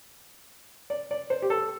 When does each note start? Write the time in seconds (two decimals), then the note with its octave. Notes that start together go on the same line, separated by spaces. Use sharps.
0.90 D5
1.11 D5
1.30 C5
1.42 G4
1.50 A4